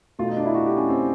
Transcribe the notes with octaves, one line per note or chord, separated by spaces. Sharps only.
B2 F#3 A3 F4
D#4
D4
E4
F#4
G4
C#4
C4